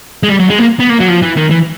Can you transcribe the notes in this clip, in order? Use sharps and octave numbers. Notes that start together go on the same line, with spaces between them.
G#3
G3
F#3
G#3
A#3
B3
A#3
F#3
F3
E3
D#3
E3